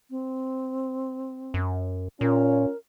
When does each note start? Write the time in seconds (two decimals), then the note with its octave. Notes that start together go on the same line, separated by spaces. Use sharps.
0.10 C4
1.54 F#2
2.21 A#2 C#4 F4 A#4